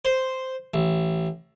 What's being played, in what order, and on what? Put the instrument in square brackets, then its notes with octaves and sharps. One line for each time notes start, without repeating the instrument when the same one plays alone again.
[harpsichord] C5
A1